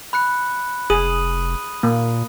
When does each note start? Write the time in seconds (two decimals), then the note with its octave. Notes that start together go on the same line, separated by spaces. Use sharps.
0.13 B5 F#6 C#7
0.90 F1 G#4 D#6 D#7 F#7
1.83 A#2 A#3